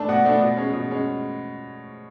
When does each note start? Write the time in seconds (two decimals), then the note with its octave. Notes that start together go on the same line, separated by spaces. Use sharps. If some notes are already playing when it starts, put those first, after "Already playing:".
Already playing: A3 D4 A5
0.09 B2 F#5
0.25 A3 D4
0.41 B2
0.57 G#3 C#4
0.73 B2
0.90 G#3 C#4